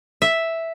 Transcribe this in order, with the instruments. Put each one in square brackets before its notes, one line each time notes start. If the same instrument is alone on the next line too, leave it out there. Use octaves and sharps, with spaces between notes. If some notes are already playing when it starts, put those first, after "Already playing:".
[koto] E5